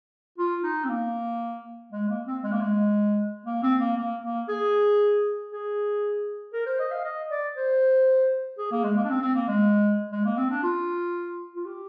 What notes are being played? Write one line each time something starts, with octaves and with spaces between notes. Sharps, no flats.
F4
D#4
C4
A#3
G#3
A#3
C4
G#3
A#3
G#3
A#3
C4
A#3
A#3
A#3
G#4
G#4
A#4
C5
D#5
F5
D#5
D5
C5
G#4
A#3
G#3
A#3
D4
C4
C4
A#3
G#3
G#3
A#3
C4
D4
F4
F4
G4